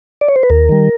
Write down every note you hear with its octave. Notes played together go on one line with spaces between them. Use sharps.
D5
C#5
C5
B4
D#2 A#4
D#3 G3